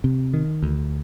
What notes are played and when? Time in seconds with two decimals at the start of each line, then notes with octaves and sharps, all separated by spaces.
0.04 C3
0.34 D#3
0.63 D2